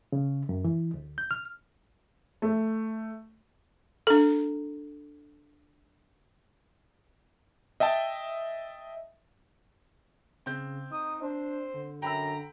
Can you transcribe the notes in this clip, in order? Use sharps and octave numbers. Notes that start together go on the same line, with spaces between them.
C#3
F#2
E3
D2
G6
F6
A3
D4 A4
D#5 E5 G5 A5
C#3 C4 G6
D#4 D#6
D4 C5
D3
F#2 G5 A#5 B5 E6